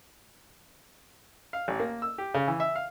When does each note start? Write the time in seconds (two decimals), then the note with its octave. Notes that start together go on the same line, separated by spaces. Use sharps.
1.53 F5
1.68 A1
1.80 A#3
2.02 E6
2.18 G4
2.34 C#3
2.47 E3
2.60 E5
2.76 F5